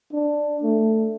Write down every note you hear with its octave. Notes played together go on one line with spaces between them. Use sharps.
D4
A3